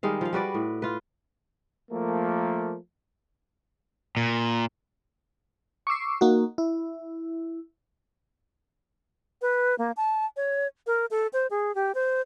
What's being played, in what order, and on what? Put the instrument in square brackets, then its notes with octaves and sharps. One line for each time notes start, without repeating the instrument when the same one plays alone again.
[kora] D#3 G3 G#3 F5
F3 F5
G3 F#4 B4 D5
A2
F4 B4
[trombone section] F3 A3 A#3
[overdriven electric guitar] A#2
[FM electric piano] C#6 D6 E6 C7
A#3 D#4 F#4
E4
[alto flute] B4
A#3
A5
C#5
A#4
A4
C5
G#4
G4
C5